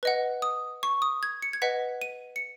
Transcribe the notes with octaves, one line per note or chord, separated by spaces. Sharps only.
B4 D#5 F#5
D#6
C#6
D#6
G#6
C#7
G#6
B4 D#5 F#5 B6
D#7
C#7